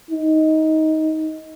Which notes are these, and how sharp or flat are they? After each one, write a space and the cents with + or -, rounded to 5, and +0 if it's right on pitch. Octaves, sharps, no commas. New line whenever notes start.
D#4 +15